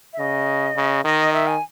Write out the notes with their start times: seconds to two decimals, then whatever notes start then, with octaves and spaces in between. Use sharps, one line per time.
0.13 E5
0.19 C#3 D#5
0.76 C#3
1.04 D#3 D#5
1.33 E5
1.47 G#5